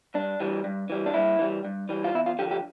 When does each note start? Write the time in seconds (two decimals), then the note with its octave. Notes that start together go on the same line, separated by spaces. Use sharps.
0.14 G2 D4
0.40 E3 G3
0.64 G2
0.90 E3 G3
1.06 D4
1.14 G2 E4
1.39 E3 G3
1.65 G2
1.89 E3 G3
2.04 F4
2.14 E2 E4
2.26 F4
2.39 D3 F3 G4
2.51 G4